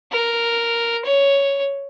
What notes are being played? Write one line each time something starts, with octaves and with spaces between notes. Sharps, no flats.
A#4
C#5